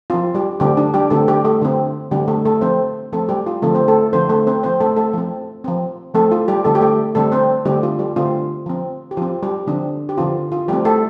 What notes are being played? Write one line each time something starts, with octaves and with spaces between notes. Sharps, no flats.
F3 C4 F4
G3 G4
D3 G3 A3 C4 G4
D4
G3 G4
D3 A3 C4 A4
G3 G4
A3 A4
D3 A3 C4
D3 G3 A3 C4 G4
A3 A4
A3 A4
F3 C4 C5
F3 A3 C4 A4
G3 G4
F4
D3 F3 A3 C4 A4
C4 C5
A3 A4
D3 F3 C4 C5
A3 A4
C4 C5
F3 C4 C5
A3 A4
A3 A4
F3 C4
F3 C4
F3 A3 C4 A4
F4
G3 G4
D3 G3 A3 C4 A4
G4
A3 A4
D3 G3 A3 C4 A4
C4 C5
D3 G3 A3 C4 G4
F4
G3 G4
D3 A3 C4 F4
F3 C4
G4
F3 C4 F4
G3 G4
D3 F3 C4 D4
G4
D3 F3 C4 F4
F4
F3 G3 A3 C4 G4
A3 A4